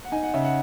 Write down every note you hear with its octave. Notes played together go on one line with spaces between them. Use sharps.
F#5
D#4 G#5
F#5
C#3 E5
F#5